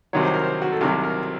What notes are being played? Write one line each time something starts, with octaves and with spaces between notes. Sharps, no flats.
C2 C3 D#3 F#3 C#5
C5
A#4
C5
F#4
A4
C2 C3 D#3 F#3 A#4
A#4